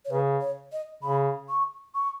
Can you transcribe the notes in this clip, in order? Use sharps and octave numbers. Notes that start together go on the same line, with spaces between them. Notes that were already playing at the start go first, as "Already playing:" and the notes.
C#5
C#3 B4
C#5
D#5
C#3 B5
C#6
C#6